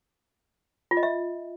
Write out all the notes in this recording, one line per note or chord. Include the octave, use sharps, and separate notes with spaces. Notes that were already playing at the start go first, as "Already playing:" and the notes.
F4
D#5
E5